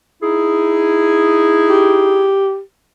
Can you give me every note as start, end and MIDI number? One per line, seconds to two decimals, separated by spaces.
0.22 2.37 63
0.22 2.37 64
0.22 2.37 68
1.70 2.60 67